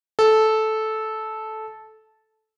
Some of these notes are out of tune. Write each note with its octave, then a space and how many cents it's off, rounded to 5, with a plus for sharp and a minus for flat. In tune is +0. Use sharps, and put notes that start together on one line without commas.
A4 -10